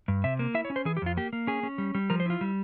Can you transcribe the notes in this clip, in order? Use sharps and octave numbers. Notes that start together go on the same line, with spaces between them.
G2
C3 E5
A#3
E4 E5
C#5
C#4
C5
E3 G#4
G4
F2 F4
A#3 G4
A#3
C#4 G#4
C#4
G3
G3
F3 A#4
C5
E4 F4
G3